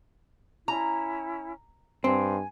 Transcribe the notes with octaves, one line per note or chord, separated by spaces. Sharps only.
C#4 E4 A#5
G2 C4 G#5